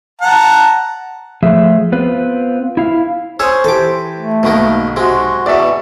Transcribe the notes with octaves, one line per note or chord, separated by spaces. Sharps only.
F#5 A5 A#5
F3 A3 G#4 E5
B3 C4 F4 B4
E4 F5
C#4 G#4 C5 C#5 E6
E3 G4 A4 D6
A3
B1 G#2 B2 D#3 A#3
C3 G#3 F#4
E2 B2 D5 E5 C#6